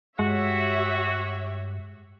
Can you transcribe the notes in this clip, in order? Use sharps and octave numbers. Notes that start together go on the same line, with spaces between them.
G2 G#3 F#4 G4 C#5 E5